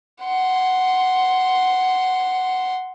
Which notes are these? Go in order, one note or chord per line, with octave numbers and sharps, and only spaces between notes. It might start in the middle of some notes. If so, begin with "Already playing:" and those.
F#5 C6